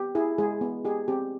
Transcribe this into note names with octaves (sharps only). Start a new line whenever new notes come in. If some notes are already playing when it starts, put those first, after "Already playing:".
Already playing: B3 G4
E4 G#4
G#3 G#4
B3
G4 G#4
C4 G4